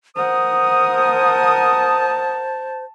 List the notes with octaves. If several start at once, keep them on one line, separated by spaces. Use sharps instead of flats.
A#4 C5 F#5 D#6
A5